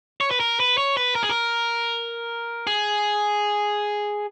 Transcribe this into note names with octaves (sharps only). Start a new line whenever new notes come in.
C#5
B4
A#4
B4
C#5
B4
A#4
G#4
A#4
G#4